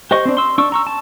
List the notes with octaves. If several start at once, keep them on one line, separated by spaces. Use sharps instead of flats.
G4 C5 D#5 C#6
C4 D4
C6 E6
D4 C#6 E6
A#5 C#6 E6
A5